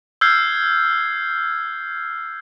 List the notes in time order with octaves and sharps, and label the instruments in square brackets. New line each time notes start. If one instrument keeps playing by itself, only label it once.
[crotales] E6 F6 G6 G#6 C7